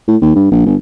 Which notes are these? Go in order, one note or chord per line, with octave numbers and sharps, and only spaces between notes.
A2
D#2
G2
A#1
G1